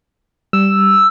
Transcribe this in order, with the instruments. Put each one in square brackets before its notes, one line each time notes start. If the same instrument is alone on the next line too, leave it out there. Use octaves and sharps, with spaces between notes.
[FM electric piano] G3 [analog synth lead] E6